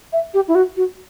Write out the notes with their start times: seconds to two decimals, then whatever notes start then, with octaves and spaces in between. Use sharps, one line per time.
0.13 E5
0.34 G4
0.48 E4
0.55 F#4
0.76 F#4